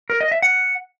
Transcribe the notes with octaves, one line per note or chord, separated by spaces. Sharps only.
A#4
D#5
E5
F#5